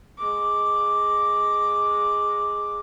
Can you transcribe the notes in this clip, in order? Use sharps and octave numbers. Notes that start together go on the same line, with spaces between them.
G#3 D6